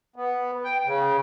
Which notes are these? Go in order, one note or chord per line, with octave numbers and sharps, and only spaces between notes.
B3
G5
C#3